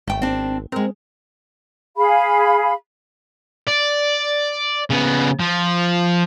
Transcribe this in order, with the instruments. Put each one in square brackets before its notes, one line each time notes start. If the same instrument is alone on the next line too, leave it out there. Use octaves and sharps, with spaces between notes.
[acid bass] G#1 [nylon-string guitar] A3 G5
[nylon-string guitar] C4 D4
[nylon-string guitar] G#3 A#4 [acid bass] C4
[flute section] G#4 F5 B5
[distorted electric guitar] D5
C#3 B3
F3